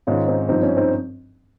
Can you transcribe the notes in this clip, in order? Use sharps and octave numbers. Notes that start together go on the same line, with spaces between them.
G#2 D#3 C#4 F4
C4 D#4
G2 F3 C4 D#4
C#4
C4 D#4